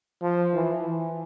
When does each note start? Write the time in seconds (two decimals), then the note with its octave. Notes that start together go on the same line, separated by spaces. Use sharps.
0.22 F3
0.54 E3
0.86 E3